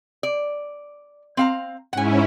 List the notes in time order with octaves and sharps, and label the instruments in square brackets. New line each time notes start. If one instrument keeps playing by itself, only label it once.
[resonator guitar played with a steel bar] D5
C4 F5 A#5
[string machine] G#2 C#4 E4 [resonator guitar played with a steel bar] F#5 G#5